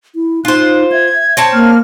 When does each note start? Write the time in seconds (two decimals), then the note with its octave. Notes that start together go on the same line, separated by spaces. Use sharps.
0.15 E4
0.45 D#4 F4 C5 F#6
0.92 E5 G#6
1.37 C4 C#5 A5
1.53 A#3 F6